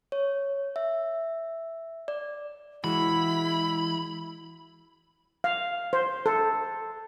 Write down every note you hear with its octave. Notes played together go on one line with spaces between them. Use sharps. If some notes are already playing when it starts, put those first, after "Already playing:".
C#5
E5
D5
E3 G#3 E4 F#4 B5
F5
C5
A4